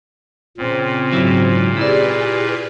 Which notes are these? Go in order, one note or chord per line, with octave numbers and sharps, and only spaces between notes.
A#2 C#3 C4
G#2 F#3 E4
E4 G4 G#4 B4 D5